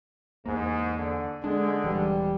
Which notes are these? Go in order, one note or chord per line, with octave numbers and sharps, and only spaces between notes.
E2 G#2 A#3
D3
D3 G#3 D4
D#1 E3 G3